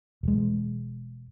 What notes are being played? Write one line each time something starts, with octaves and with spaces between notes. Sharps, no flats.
E1 G#3